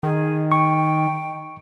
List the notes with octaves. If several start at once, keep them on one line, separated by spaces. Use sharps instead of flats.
D#3 G#4
G5 C#6